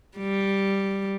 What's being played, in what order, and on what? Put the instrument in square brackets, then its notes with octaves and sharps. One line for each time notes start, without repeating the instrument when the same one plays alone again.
[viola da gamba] G3